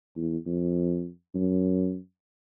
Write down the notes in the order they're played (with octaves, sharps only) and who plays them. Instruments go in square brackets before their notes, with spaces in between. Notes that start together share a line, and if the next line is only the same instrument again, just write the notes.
[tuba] E2
F2
F#2